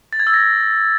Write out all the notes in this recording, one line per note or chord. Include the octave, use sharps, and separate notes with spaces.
A6
G#6
E6
A#6